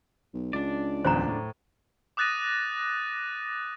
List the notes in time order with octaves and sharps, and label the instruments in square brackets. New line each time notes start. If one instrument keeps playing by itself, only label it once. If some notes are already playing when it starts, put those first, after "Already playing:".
[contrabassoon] B1
[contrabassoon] C#2 [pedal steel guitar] D4 D5
[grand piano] D1 E2 [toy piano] C5 A#5
[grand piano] A2
[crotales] D6 D#6 F#6 A6 A#6 D#7